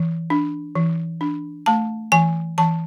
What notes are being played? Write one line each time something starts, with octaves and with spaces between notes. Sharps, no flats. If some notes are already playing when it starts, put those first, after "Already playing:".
Already playing: E3
D4
E3
D4
A3 A5
E3 G#5
E3 A5